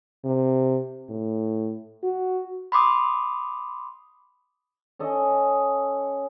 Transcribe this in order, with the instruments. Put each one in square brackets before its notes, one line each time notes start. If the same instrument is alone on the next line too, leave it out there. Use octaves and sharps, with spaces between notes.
[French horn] C3
A2
F#4
[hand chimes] B5 C6 D6 D#6
[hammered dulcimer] C#4 A4 D#5